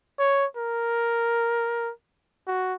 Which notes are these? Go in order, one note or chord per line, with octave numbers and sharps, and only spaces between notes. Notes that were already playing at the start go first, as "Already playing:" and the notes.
C#5
A#4
F#4